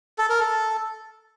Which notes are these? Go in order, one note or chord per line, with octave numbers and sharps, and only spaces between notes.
A4
A#4
A4